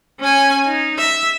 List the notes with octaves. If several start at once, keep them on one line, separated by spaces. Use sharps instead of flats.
C#4 G#5
D#4
E5